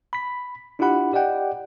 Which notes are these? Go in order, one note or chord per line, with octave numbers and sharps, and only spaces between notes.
B5 B6
D4 E4 F4 G4 F#5 B5
G4 D5 D#5 F#5 G5